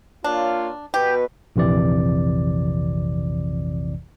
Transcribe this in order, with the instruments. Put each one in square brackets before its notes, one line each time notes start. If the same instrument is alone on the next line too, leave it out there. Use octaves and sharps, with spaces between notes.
[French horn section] A#3 F4 C#5 [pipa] D4
[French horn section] B2 B4 [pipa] G4
[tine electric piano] A#1 F2 C3 E3 D5